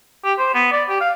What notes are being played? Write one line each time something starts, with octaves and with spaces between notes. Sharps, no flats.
G4
C5
B3
D5
G4
F5